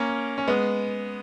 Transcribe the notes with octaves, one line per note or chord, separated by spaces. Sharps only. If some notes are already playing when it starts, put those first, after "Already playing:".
Already playing: A#3 C#4
C#4
G#3 B3